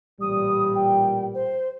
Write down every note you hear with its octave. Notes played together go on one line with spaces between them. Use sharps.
A1 A#2 G3 D#6
G5
C5